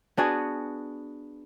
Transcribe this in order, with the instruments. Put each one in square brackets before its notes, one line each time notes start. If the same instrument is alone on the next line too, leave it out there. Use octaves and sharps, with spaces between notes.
[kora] B3 D4 F#4 G#4